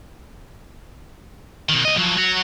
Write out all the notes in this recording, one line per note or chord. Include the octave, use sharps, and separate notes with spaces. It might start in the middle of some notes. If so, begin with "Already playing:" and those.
B2 D#3
C#2 D#5
F3 F#3
F#3 F#4